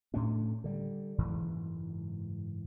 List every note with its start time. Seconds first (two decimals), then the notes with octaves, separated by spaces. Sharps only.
0.14 A2 A3 C#4 D4
0.64 D3 G3
1.18 F#1 G#2 E3